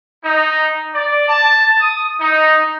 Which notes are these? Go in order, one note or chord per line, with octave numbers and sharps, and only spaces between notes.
D#4
D5
A5
D#6
D#4